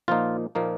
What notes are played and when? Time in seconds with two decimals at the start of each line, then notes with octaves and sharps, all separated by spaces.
0.08 A#2 F3 A#3 D#4 F4
0.55 A#2 F3 A#3 D#4